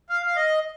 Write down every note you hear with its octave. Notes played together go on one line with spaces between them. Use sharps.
F5
F5
D#5